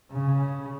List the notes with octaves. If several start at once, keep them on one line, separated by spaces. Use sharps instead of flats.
C#3